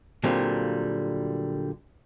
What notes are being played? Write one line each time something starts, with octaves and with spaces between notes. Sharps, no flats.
A#2 D3 F#3 G3 A#3 C4